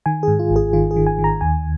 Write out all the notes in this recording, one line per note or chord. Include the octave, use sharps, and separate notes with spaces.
D#3 G#5
G#2 G#4
F4
G#1
G#4
D#3 F4
G#4
D#3
G#5
D#3
A#5
D#2 G#5